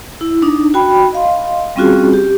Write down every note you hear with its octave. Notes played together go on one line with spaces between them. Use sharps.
E4
D4 D#4
F#4 G5 B5
D#5 F5 C6
G3 C4 C#4 F4 F#4 G#4
G4